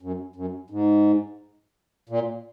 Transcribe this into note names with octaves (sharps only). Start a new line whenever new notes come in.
F#2
F#2
G#2
A#2